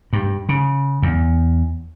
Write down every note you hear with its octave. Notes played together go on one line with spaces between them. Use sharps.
G2
C#3
E2